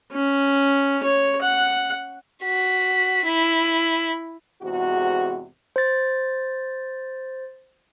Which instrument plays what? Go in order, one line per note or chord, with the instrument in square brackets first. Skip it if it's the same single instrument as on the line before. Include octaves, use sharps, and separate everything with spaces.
[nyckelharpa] C#4
C#5
F#5
[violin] F#4 B6
E4
[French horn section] E2 G#2 C3 F#4
[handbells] C5 A6